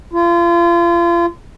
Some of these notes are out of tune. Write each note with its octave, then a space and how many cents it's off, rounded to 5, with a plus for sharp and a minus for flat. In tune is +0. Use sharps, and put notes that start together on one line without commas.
F4 -35